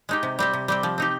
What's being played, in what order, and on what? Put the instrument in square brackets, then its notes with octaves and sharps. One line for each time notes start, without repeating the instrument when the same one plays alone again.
[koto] G#3 D#4 G4
C3
G3 C4 G4
C3
G3 C4 G4
F3
C4 D#4 G4